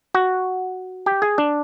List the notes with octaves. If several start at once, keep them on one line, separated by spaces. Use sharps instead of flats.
F#4
G4
G#4
D4